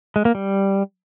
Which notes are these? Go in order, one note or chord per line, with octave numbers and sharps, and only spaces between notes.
G#3
A#3
G3